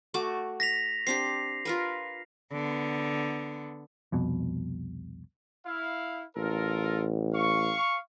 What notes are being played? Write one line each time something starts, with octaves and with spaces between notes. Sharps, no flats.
A3 F#4 D6
A#6 B6 F7
C4 D4 G4 C7
F4 A#4 B4
D3 B3
C2 F2 B2
E4 F5
A1 F4 A4 A#4
F5 C#6